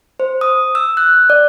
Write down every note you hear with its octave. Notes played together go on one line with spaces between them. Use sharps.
C5
D#6
E6
F#6
D5